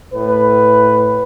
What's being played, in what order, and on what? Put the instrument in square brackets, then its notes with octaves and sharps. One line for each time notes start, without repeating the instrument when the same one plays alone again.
[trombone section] A2 B4